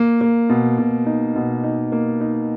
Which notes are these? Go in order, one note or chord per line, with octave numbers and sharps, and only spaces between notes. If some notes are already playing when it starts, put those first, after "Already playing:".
Already playing: A#3
A#3
B2
B2
D#4
B2
D#4
A#3
D#4